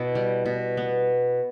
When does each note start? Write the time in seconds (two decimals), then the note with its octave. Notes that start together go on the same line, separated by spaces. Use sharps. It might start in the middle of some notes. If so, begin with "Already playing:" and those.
Already playing: B2 E4
0.15 G3
0.46 B2
0.77 B3